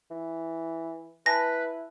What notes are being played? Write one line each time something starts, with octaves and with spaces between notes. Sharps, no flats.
E3
E4 B4 G#5 A5 B5 A#6